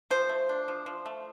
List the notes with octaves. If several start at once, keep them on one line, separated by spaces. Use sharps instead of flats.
F3 C5
A3
D4
F3
F3
A3